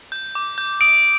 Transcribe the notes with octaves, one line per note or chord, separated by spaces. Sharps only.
G6
D6
G6
D#6 D7